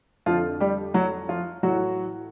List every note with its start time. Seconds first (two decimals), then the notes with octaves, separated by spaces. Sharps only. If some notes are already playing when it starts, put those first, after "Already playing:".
0.26 F2 D3 F3 F4
0.60 G3 G4
0.94 F#3 F#4
1.29 F3 F4
1.63 A2 E3 F#3 F#4